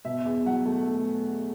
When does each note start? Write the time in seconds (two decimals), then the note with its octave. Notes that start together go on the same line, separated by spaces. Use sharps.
0.05 B2 E5
0.25 E2
0.45 F#3 F#5
0.66 A3